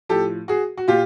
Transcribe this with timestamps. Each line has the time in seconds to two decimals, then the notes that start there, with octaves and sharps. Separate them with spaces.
0.09 A2 F3 G4 A4
0.48 F#4 G#4
0.77 F#4
0.88 A#2 F4 G4